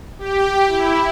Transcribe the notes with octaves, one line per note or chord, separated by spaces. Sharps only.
G4
E4